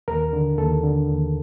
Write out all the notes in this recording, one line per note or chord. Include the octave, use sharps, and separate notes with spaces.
D#2 A#4
D3
D#2 A4
D3
D#2